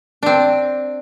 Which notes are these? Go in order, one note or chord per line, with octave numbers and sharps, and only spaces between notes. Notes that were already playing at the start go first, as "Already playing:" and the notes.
C4 D4